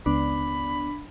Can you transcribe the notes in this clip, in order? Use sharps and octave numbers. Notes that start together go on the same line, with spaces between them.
C#2 B3 D4 B5